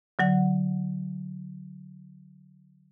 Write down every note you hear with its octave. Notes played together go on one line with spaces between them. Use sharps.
D3 F#3 F#5